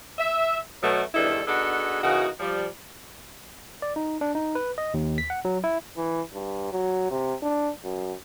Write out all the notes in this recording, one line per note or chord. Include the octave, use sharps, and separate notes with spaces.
E5
B2 F#3 A3
E2 G2 D#3 D4 E4 A4
B3 D4 D#4 F#4 G#4 A4
C#3 E3 A#3 D#4 F#4
F3 G3
D5
D#4
D4
D#4
B4
D#5
D#2
B6
F#5
F#3
E4
E3
G2
F#3
C3
D4
F#2